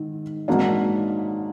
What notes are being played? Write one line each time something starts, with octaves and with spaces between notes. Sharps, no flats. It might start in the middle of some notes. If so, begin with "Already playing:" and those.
Already playing: G#2 D#3
G#2 F#3 A#3 D4